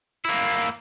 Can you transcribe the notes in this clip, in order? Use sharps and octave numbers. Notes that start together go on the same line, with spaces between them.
A#3 E4